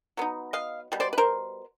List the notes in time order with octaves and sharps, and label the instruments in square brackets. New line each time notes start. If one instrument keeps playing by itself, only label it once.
[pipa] F#3 B3 D#4
D#5 F5
B2 G3
C5 D5
B4
A#4 C5